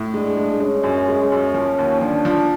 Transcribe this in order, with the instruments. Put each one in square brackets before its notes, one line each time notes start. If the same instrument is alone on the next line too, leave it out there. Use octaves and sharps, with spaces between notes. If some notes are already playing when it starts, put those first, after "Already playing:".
Already playing: [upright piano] A2
[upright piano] G#3 [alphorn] D4
[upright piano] G#3
[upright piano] G#3 [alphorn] C#4
[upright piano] F#2
G#3
F#2
F3
D#2
[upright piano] F3 [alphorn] D4
[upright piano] F3